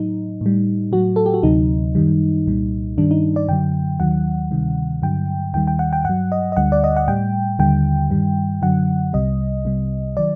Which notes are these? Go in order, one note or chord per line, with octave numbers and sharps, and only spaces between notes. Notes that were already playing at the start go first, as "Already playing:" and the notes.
Already playing: A2 F#3 D#4
A2 G3
A2 F#3 F#4
A4
G4
F#4
D2 C3 F#3 D#4
F#2 D#3 G3
C2 A#2 G3
G2 D#3 G3 D4
D#4
D5
F#2 D3 F#3 G5
D#2 D#3 F#3 F#5
D2 C3 D#3 G3
G2 D3 F#3 G5
D#2 D#3 G3 G5
G5
F#5
G5
G2 F#3 F#5
D#5
D#5
D2 D3 G3 F#5
D5
D#5
F#5
A2 G3 G5
D#2 D3 G3 G5
G2 D#3 G3
F#2 D3 F#3 F#5
C2 C3 G3 D#5
C2 C3 G3
D#3 F#3 D5